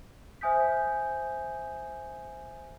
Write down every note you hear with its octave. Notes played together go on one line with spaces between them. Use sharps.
C5 E5 G#5 D#6 G6 B6